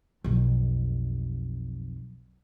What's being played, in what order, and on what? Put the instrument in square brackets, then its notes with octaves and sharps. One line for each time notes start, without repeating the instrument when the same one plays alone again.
[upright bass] B1 F2